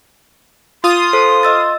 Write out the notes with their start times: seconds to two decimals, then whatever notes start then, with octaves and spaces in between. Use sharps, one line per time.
0.84 F4 C6 D#6
1.13 A4 C5
1.43 D#5 E6 A6